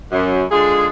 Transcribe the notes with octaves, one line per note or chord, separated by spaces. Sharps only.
F#2
D3 G#3 F4 G#4